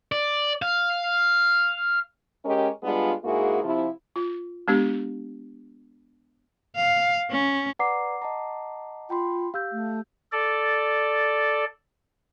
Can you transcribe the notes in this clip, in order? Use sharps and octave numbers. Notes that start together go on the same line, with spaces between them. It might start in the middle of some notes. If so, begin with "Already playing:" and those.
D5
F5
G#3 C#4 G4 A#4 D#5
G3 G#3 B3 D4 F4
G#2 A#3 E4 F#4 G#4
C3 F3 E4
F4
G#3 B3 D4 G4
F5
C#4
B4 D5 F#5 A#5 D6 C7
D#5 A5 A#5
F4 G5 B5 C6
G4 F5 E6 G6
A3
A4 D5